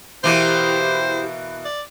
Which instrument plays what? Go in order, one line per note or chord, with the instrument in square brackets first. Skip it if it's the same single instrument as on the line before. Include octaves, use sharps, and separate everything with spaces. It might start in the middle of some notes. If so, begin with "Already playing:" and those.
[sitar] B2 E3 A#3 [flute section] E4 G4 [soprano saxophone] C5
[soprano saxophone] D5